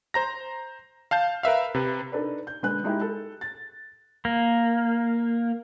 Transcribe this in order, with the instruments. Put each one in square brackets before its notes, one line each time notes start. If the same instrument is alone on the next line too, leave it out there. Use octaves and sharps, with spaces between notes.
[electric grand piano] C5 A#5 A#6
F5 A5 G6
A#4 B4 E5 F5
C3 B4
[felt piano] D4 D#4 A4 B4 D5
G6
D3 G#3 B4 G#5 F#6
G#3 D#4 E4 G4
A4
A6
[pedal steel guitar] A#3